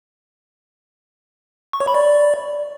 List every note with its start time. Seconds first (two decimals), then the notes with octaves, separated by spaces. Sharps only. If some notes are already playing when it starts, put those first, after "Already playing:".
1.73 C#6
1.80 C#5
1.87 B5
1.94 D5